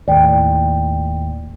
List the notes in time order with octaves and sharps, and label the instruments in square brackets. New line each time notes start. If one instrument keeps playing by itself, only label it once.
[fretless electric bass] D#2 A2 [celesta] D5 G5